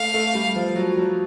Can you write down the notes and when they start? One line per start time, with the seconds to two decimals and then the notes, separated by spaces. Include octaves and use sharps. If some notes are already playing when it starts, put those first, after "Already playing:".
Already playing: A3 F5
0.14 A3
0.35 G3
0.55 F3
0.76 F#3
0.97 F#3